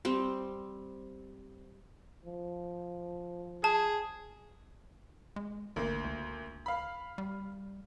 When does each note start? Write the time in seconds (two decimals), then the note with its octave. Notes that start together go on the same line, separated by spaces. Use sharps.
0.05 G3 C4
2.25 F3
3.64 G#4 A5
5.36 G#3
5.76 G#1 D2 A#3
6.04 C#2
6.66 F5 B5
7.18 G3